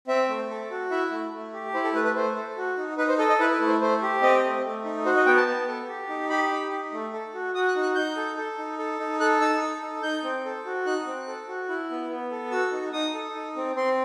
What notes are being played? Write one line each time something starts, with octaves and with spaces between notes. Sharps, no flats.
C4 E5
A3
A4
F#4
E4 E5
A3
A3
G4
E4 C5
A4
A3 B4
B4
A3 C5
A4
F#4
D#4
D#4 B4
C5
A4 D#5
D#5
E4 B4
B4
A3
C5
A3 C5
G4
C4 D#5
A3
A3
D#4
F#4 C5
D#5
B3 G5
A5
B3
A4
G4
D#4
G4 B5
D#4
D#4
A3
A4
F#4
F#4 D#6
F#6
D#4
F#6
D#4 G6
A4
A4
D#4
A4
D#4
A4 F#6
D#4 E6
A4
D#4
D#4 G6
C4
A4
F#4
D#4 F#6
C4
A4
F#4
E4
B3
B3
A4
F#4 E6
D#4
D#4 D#6
A4
D#4
C4
C4 C6